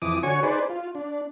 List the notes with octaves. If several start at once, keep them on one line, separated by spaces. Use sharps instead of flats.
F2 E3 D6 D#6
D3 F#4 C#5 G#5 C#6
D#4 G#4 B4 C5 D5
F4
D4